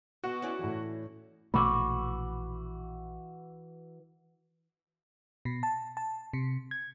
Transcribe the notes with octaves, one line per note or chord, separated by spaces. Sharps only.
B2 F#4
C#4 E4 D5
A2 E3
A#1 B2 E3 A3 F#4 B5 D6
B2
A5
A5
C3
G#6